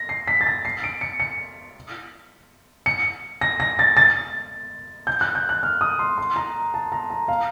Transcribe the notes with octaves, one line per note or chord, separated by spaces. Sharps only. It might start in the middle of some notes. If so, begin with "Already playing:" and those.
Already playing: A#6
C7
B6
A6
A#6
C7
D7
C#7
C#7
C#7
A#6
A#6
A6
A6
G6
F#6
G6
F#6
F6
D#6
C6
C6
A#5
A5
A#5
A#5
F5